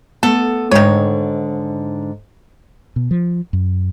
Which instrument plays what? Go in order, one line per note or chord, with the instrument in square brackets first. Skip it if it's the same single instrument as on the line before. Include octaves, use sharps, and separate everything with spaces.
[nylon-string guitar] A3 B3 [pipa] A4
[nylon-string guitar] G#2 D3 [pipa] D#3 C#5
[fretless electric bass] B2
F3
F#2